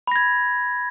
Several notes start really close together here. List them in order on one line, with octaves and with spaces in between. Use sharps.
B5 A#6 G#6